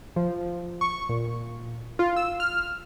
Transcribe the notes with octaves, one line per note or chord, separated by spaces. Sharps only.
F3
C#6
A#2
F4
E6
F6